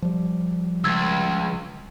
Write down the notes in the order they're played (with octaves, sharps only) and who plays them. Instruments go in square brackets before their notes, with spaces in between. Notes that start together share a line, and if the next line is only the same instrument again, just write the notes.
[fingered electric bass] F3 G3
[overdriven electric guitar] C#2 [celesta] E6 G#6 A6